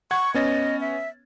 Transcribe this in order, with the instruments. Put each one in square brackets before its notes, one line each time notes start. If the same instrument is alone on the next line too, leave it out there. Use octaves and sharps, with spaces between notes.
[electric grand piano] F#5 G#6 [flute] C#6
[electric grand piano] B3 C#4 A6 [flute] D#5
[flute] E5